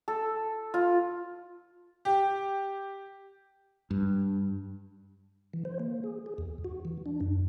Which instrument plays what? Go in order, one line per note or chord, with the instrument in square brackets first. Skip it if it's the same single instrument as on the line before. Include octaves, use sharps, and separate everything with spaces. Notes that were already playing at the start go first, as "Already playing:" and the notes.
[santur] A4
F4
[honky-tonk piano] G4
[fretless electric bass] G2
[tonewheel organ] E3
C5
A#3
G#4
G#4
E2
F#4
E3
D4
F#2